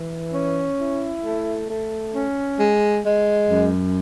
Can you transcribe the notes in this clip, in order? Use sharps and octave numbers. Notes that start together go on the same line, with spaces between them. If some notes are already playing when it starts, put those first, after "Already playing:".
Already playing: E3
C#4
E4
A3
A3
C#4
G#3
G#3
F#2